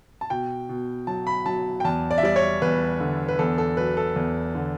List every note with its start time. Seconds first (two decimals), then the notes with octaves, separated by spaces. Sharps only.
0.21 A5
0.30 B2 G5
0.69 B2
1.07 F#3 A5
1.27 B5
1.46 F#3 A5
1.80 G5
1.84 E2 A5
2.11 D5
2.18 E5
2.23 G3 D5
2.36 C#5
2.62 E2 B4
3.00 D3
3.28 B4
3.39 E2 A4
3.58 A4
3.77 F#3 B4
3.97 A4
4.16 E2
4.55 D3